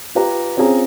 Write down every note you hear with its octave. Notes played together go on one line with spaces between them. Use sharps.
F4 G4 B4 A#5
C4 C#4 F4 G#4 A#5